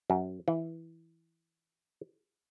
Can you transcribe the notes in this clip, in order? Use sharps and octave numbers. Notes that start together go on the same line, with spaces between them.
F#2
E3